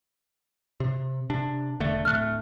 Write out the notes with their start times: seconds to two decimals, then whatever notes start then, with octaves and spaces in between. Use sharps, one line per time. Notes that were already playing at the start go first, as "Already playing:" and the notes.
0.80 C3
1.30 C3 D4
1.80 E1 D3 A3
2.05 D1 A3 F6 F#6